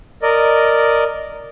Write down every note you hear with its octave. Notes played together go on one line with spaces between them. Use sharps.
A#4 D5 D#5